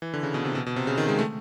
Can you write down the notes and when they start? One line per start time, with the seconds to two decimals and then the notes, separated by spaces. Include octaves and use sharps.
0.02 E3
0.14 D3
0.23 C#3
0.34 B2
0.45 C3
0.55 B2
0.66 B2
0.76 C3
0.87 C#3
0.98 D#3
1.08 G#3
1.19 A3